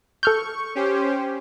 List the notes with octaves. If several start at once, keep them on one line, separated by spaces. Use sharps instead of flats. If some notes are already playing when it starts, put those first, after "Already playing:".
A4 C#6 F6 G6
C#4 G4 C5